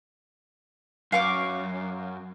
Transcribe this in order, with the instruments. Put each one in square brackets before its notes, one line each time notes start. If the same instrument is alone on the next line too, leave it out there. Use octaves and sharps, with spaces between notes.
[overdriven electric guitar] F#2 [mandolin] F5 C#6 D6